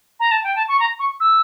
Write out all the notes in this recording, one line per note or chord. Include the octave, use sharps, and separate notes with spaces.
A#5
A5
G5
A5
C#6
A#5
C#6
E6